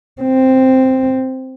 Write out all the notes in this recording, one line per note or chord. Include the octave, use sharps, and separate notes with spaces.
C4